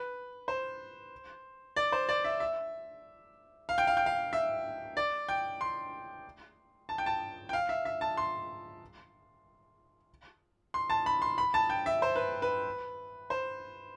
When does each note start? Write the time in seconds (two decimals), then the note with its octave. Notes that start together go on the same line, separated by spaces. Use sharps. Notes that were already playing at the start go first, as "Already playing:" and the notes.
Already playing: B4
0.48 C5
1.76 D5
1.92 C5
2.09 D5
2.24 E5
2.40 E5
3.69 F5
3.78 G5
3.87 F5
3.97 G5
4.06 F5
4.33 E5
4.97 D5
5.29 G5
5.61 C6
6.89 A5
6.98 G5
7.06 A5
7.49 G5
7.53 F5
7.69 E5
7.85 E5
8.01 A5
8.17 C6
10.74 C6
10.90 A5
11.06 B5
11.22 C6
11.38 B5
11.54 A5
11.70 G5
11.86 E5
12.02 C5
12.16 B4
12.42 B4
13.30 C5